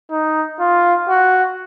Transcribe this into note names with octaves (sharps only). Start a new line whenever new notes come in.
D#4
F4
F#4